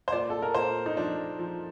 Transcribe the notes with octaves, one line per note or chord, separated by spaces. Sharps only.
C5
A#2 D5
A4
A#4
A#2 C5
D#4
F3 D4
F3